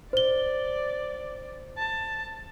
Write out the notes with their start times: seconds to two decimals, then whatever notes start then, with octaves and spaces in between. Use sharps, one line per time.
0.13 C5 D5 G7
1.78 A5